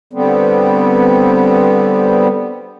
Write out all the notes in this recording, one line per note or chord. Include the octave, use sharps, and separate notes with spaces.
D3 G3 B3 C4